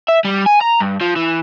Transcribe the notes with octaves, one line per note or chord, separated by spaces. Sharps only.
E5
G3
G#5
A#5
G2
F3
E3